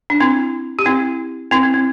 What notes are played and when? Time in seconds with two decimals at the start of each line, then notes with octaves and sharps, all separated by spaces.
0.10 D4
0.20 C4 E4
0.79 G4
0.86 C4 E4
1.51 C4 E4
1.63 C4
1.74 C4